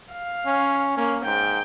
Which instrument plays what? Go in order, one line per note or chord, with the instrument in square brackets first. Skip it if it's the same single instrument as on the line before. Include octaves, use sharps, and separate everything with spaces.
[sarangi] F5
[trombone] C#4
[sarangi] A#3 [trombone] C#4
[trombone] G#2 [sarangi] G5